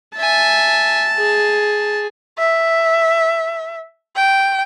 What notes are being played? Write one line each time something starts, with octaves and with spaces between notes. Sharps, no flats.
E5 G#5 A5
G#4
E5
G5